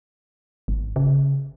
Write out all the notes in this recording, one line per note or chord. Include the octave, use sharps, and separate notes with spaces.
G#1
C#3